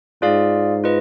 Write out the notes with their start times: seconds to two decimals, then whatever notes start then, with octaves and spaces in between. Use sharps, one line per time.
0.22 G#2 F4 G#4 D5 F5
0.84 F4 B4 D#5